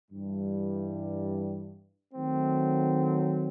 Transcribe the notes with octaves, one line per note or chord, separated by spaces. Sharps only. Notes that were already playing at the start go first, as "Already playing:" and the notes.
G2 E3 G3
D#3 F#3 A3 C4